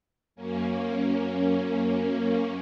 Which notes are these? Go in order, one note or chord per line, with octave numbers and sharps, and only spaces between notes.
F#2 A#3 C#4